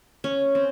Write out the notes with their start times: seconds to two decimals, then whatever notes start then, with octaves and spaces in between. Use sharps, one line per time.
0.24 C#4
0.55 C4